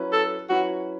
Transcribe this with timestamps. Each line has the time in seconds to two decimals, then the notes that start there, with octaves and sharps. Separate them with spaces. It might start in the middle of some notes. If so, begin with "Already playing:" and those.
Already playing: F#3 C#4 E4 B4
0.12 A4
0.49 F#3 C#4 E4 F#4 B4